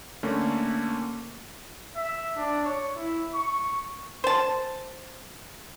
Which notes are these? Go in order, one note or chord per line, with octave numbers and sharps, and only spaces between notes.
D3 A3 A#3 C#4
E5
D4
C#5
E4
C#6
C5 A5